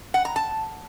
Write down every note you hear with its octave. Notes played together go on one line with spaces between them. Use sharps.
F#5
A#5
A5